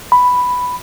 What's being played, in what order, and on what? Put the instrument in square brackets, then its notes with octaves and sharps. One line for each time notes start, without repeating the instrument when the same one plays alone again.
[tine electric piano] B5